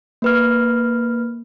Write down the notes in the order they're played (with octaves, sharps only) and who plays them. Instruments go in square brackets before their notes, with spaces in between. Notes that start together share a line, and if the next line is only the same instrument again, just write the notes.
[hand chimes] A#3 B4 F6